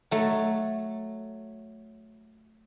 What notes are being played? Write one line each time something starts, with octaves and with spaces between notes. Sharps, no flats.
F#3 A3